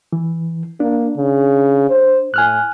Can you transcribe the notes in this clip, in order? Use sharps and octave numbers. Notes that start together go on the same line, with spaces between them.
E3
A#3 D4
C#3
C5
A2 G#5 F6 F#6